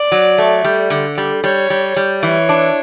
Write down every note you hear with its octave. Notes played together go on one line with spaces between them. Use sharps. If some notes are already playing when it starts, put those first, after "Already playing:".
Already playing: D5
F#3
A3
G3
D3
G3
G3 C#5
G3
G3
E3 C#5
D4